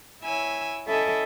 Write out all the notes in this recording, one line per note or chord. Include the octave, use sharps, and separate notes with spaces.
E4 C#5 G#5 E6
C#4 E4 A4 D#5 E5 G#5